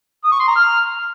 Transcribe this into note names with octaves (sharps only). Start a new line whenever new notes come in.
D#6
C#6
C6
A#5
F6